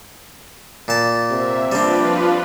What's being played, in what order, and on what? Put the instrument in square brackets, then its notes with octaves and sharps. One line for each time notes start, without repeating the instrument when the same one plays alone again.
[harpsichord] A#2 A5
[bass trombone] C3 [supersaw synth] A#3 E5
[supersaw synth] F3 F4 B4 [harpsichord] G3 C4 [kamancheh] D4